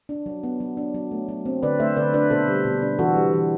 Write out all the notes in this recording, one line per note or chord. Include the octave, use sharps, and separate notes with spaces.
D4
F#3
B3
F#3
D4
F#3
A3
F#3
C4
D3 B4 D5
A3 C5 E5
D3 B4 D5
D4 B4 D5
B2 A4 C5
G3
B2
D4
E3 F#4 A4
G3
E3